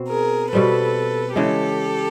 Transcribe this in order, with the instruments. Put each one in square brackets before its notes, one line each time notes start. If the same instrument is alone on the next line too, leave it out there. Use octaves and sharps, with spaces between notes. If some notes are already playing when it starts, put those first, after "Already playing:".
Already playing: [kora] B2 C4
[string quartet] G#4 A#4
[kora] B2 G3 C4 [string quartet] A4 B4
[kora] C#3 E3 G#3 [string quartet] G4 A4